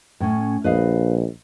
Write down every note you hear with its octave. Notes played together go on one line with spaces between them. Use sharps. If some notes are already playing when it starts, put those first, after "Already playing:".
A2 C#4
A#1 B4 D#5 F5